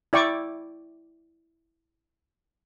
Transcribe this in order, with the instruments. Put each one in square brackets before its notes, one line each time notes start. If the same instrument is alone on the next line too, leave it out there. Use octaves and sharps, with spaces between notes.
[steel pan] E4 D5 G5 C#6 D6